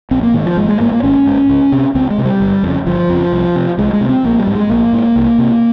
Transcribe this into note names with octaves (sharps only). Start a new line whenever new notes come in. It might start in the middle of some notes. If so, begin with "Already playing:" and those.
A#1 C4
A#3
G#2 D#3
F3
G#1 G#3
G#3
G#2 A#3
A#3
G#1 C#4
G#2
C#2
C3
C#2 C4
G#3
C3
G3
G1
F2 C#3
G1 F3
F2 C#3
C2
C3
C2 G#3
G#3
C3
C4
A#1 A#3
G3
G#2
G#3
A#1 A#3
G#2
C2
C3